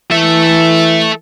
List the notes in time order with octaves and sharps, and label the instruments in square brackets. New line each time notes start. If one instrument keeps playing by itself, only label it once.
[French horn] E3 [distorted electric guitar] A4 E5